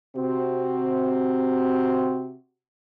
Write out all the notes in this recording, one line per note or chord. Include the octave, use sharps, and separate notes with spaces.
C3 C4 F#4